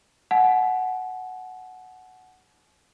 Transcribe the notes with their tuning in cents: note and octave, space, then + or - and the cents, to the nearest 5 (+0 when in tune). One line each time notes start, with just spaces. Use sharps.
F#5 +0 A5 -45